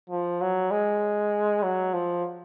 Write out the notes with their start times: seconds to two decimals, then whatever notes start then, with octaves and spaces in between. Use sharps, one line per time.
0.09 F3
0.41 F#3
0.71 G#3
1.62 F#3
1.93 F3